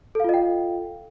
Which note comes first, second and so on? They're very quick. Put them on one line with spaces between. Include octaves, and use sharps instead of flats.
A4 F5 F4 D#5 G5